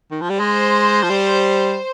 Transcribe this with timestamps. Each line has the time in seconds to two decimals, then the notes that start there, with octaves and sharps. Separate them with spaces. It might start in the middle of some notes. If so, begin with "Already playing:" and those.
0.11 D#3
0.21 F3
0.30 G3
0.39 G#3 C5
1.03 F3
1.09 G3